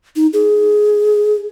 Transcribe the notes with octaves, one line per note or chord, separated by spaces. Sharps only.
D#4
G#4